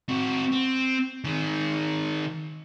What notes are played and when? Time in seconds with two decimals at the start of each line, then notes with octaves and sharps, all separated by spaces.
0.09 C4 F#4
0.52 C4
1.24 D#3 G#4